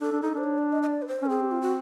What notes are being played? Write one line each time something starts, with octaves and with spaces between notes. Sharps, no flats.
D4 A4
D4
D#4 A4
D4 C5
C#5
D5
D#5
D#5
D5
B4
C5
C#4
A4
C4 G#4
G4
F4
F#4